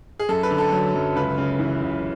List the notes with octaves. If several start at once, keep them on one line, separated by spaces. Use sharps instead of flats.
G#4
F#2 A4
B4
D3
A4
F#3
F#2
C#2 B4
C#3
E3
C#2